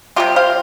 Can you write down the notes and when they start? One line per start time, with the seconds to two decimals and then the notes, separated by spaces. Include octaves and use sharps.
0.16 C3 G3 A#3 F4 G4
0.36 C5 F5